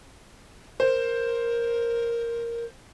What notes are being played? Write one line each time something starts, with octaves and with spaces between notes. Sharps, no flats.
A#4 C5